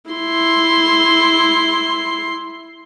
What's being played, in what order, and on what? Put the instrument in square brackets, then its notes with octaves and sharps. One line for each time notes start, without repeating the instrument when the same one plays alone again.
[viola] E4 C6